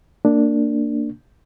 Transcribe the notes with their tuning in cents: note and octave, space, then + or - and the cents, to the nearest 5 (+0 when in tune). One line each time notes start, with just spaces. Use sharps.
A#3 -25 D4 +0